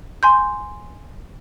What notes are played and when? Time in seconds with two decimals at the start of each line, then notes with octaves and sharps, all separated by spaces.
0.23 G#5 C6 G6